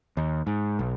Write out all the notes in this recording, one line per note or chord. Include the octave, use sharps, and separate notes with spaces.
D#2
G#2
B1